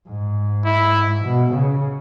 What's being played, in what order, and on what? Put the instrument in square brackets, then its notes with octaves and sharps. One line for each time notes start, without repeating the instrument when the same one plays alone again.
[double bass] G#2
[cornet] E4
[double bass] B2
C#3